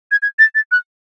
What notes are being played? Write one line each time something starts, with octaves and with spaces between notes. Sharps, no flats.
G#6
G#6
A6
A6
F#6